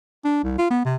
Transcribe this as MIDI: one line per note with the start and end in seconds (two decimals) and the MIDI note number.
0.24 0.42 62
0.43 0.57 36
0.58 0.68 65
0.70 0.84 59
0.85 0.96 48